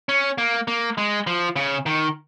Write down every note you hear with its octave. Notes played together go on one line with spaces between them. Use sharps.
C#4
A#3
A#3
G#3
F3
C#3
D#3